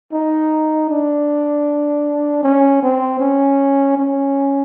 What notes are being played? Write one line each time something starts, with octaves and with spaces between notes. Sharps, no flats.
D#4
D4
C#4
C4
C#4
C#4